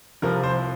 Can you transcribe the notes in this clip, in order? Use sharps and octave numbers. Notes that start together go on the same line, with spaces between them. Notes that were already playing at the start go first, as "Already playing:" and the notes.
C2 C3 F3 A#4
C5